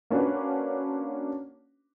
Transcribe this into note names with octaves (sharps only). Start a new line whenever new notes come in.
A#3 C#4 D4 F#4 B4